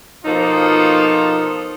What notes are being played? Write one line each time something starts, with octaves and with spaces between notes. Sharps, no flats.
B2 F3 A#3 D#4 F4 A4